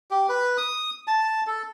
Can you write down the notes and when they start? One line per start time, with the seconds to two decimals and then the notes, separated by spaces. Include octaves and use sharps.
0.11 G4
0.29 B4
0.57 D#6
1.07 A5
1.47 A4